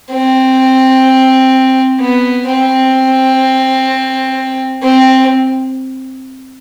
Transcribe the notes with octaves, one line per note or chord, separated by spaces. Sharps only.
C4
B3
C4
C4